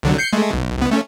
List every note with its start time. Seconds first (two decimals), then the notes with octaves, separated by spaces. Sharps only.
0.03 C2 D3 F#3
0.18 G6 C7 C#7
0.33 G#3 A3
0.53 B1
0.78 C2 B3
0.91 A3 C#4